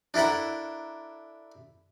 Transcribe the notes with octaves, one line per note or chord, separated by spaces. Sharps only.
D4 E4 A4 A#4 F#5